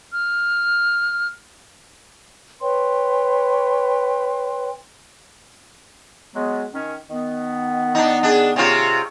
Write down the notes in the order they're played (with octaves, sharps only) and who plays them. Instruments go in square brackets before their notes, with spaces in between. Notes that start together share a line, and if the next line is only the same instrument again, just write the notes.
[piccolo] F6
[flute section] B4 C#5 G5 C6
[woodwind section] F#3 G#3 B3
D#3 C#4
D#3 B3
[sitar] D4 D#4
D4 G#4
C3 C#4 F4